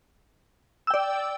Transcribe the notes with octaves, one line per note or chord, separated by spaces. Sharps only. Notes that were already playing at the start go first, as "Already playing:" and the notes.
D5 G5 E6